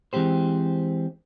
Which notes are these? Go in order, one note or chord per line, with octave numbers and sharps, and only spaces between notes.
E3 G#3 C4 G4 C5